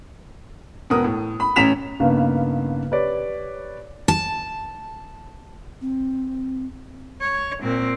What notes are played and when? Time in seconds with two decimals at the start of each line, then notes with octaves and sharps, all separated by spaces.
0.90 E1 B3 A#4 D#6
1.04 A2
1.40 B5
1.56 A1 C#4 A#5 B6 E7 F7
2.00 G2 C#3 A#3 B3 D#4
2.91 G4 B4 C#5 D5
4.08 A5
5.81 C4
7.21 C#5
7.62 A#2 C4